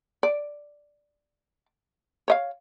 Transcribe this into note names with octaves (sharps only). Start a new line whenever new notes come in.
D5
C#5 D#5 F5